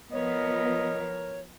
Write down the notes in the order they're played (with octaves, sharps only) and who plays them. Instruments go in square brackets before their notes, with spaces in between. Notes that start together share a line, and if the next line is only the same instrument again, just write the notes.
[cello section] F3 B3 [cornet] A#4 [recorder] C#5 [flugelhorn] D#5